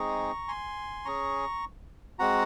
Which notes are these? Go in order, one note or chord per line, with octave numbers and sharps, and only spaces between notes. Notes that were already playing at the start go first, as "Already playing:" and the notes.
Already playing: G#3 C4 D#4 G#4 A#5 C#6
G#5 C6
C#4 G#4 A#5 C#6
G#3 C4 F#4 F#5 A#5